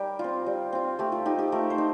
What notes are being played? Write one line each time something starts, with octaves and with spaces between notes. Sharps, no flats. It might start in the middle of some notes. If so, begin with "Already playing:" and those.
Already playing: G3 G4 A#4
C4 F4
G3
C4 F4
A3 G4
F4
D#4 G4
G4
A3 A#4
C5
D#4